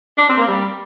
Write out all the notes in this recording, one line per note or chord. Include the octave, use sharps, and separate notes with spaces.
D4
C4
A#3
G3